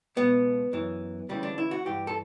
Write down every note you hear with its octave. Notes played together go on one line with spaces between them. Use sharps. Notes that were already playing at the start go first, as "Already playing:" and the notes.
C#2 B2 B3
F#2 E3
D2 C#3 E3 G3
D4
E4
F#4
G2 E3 G4
A4